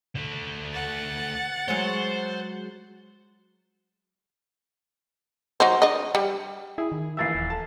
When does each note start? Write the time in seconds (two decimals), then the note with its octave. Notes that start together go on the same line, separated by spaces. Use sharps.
0.16 D3 A3
0.72 F#5 A6
1.68 F#3 G#3 C5 C#5
5.60 F#3 D#4 C5
5.82 D4 D#5
6.15 G3
6.78 E4 G#4
6.92 D#3
7.17 A#1 E3 E5 E6 A6 C7
7.35 D#1
7.50 A4 A5